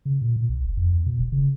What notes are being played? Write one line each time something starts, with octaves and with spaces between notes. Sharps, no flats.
C#3
A#2
A#2
B1
E1
F2
E2
B2
D#1
C#3